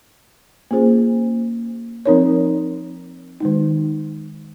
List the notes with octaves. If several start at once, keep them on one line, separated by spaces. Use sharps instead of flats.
A#3 C#4 F4 G#4 C5
F3 C4 D#4 A#4 C#5
D#3 G#3 D#4